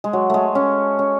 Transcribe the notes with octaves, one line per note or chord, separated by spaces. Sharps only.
G#3
F#3
G#3 A3
C#4
C#4